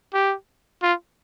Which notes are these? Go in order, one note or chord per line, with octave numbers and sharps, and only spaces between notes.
G4
F4